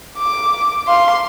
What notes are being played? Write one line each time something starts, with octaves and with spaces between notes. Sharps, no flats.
D6
F5 C6